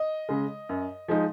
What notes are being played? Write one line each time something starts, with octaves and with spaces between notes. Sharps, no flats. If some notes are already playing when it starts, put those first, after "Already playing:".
Already playing: D#5
C#3 G#3
F#2
F3 G#3 D#4